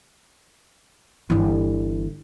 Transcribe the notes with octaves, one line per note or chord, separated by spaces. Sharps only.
G1 E3